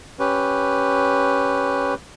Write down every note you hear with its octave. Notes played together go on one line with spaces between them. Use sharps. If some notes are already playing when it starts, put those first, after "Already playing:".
C#4 G4 B4